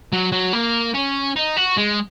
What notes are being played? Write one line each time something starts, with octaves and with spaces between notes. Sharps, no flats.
F#3
F#3
A#3
C#4
D#4
F#4
G#3